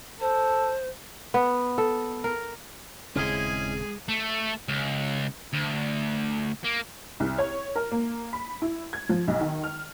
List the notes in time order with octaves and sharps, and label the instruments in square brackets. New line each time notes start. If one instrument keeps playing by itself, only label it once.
[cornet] A4 [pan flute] C5
[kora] B3
A4
A#4
[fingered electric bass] D#1 C#3 C4 [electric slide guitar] G#3 [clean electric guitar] C#4 E4 D#5 [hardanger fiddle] G#4
[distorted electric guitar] A3
C#2
D2
A#3
[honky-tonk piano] C2
C#5
A#4
A#3
B5
E4
G#6
F3
B1
D#3
F6